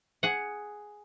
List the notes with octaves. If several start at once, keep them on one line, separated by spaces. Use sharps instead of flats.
G#4 F#5